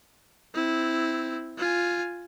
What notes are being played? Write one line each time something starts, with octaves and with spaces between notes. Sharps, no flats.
C4 E4
F4 G#5